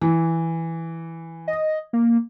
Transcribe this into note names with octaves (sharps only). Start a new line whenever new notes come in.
E3
D#5
A#3